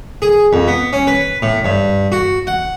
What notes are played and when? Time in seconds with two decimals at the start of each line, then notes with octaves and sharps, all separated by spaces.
0.22 G#4
0.53 F2
0.68 B3
0.93 C#4
1.07 B4
1.42 A2
1.65 G2
2.12 F#4
2.47 F#5